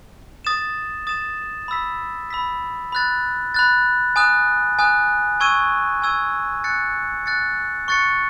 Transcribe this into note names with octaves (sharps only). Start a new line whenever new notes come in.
D#6 A6 E7
D#6 A6 E7
B5 E6 B6
B5 E6 B6
B5 F#6 A6
B5 F#6 A6
G#5 D#6 F#6
G#5 D#6 F#6
G#5 C#6 E6 G#6 D#7
G#5 C#6 E6 G#6 D#7
F#6 A6 C#7
F#6 A6 C#7
C#6 F#6 A6 C#7